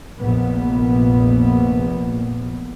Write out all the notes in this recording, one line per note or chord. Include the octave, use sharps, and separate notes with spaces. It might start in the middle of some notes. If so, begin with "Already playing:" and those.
F1 A#1 A#2 B3